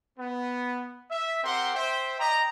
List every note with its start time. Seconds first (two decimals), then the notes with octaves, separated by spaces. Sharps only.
0.18 B3
1.11 E5
1.44 C4 G4 A#4 F#5 G5 C6
1.75 C5 E5 G5
2.20 D5 D#5 G5 A#5